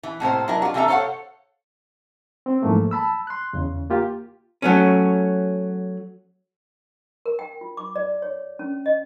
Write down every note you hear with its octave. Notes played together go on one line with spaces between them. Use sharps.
E3
A2 C3 A#3 C5
F#3 D4 E4 A#4
F4 F#4
C3 E3 A#3 A4 E5 A#5
A4 C5 C#5 F5 F#5
C4
G#2 E3 F3 A3 A#3
A5 B5 E6
C6 F#6
E2 C#3
A#3 F4 G4
F#3 A3 C#4
A#4
G5
F4
D6
D5
C#5
C#4
D#5